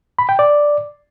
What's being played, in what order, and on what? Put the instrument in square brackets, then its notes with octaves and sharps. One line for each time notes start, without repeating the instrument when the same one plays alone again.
[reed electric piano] B5
G5
D5